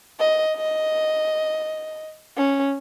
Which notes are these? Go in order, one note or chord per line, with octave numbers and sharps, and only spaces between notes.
D#5
D#5
C#4